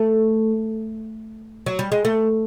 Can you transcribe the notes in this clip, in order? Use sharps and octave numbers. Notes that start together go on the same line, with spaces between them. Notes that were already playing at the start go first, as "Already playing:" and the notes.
Already playing: A3
F#3
G3
G#3
A3